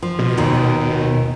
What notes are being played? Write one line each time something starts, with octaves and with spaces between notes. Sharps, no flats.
F3
B2
D#2 A#2 D#3